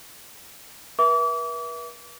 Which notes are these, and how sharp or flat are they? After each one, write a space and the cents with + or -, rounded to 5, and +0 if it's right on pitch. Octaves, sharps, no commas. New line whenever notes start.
B4 -40 E5 +0 D6 -35